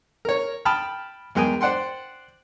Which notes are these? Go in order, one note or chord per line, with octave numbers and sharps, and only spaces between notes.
A#4 C#5
G5 A5 B5 D#6 F6
E2 G#3 A#4 G5 G#5 D#6
C5 D5 F#5 G5 C6